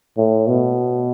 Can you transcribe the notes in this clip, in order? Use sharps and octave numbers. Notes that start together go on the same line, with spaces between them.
A2
B2